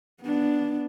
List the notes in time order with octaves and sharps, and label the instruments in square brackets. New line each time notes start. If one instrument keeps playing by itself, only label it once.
[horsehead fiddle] B3 D4